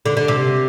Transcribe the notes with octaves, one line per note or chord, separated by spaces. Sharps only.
D3
D3
C3